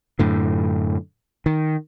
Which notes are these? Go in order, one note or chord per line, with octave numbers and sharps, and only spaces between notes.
F#2 A2 D3
D#3